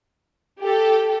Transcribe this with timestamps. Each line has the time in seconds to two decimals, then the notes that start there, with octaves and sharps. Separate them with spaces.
0.61 G4 A4